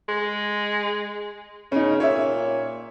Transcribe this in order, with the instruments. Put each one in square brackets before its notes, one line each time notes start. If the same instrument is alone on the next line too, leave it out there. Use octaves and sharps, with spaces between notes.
[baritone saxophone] G#3
[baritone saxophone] C#3 [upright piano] C#4 D#4
[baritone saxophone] A#2 [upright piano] C#5 E5